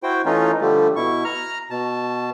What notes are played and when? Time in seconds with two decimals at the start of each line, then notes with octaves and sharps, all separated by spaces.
0.03 E4 F#4 C5 G5
0.25 E3 A3 C#4 D#4 F4
0.61 D3 F3 G3 A3
0.96 B2 E4 C#6
1.25 A#5 F6
1.70 B2 A5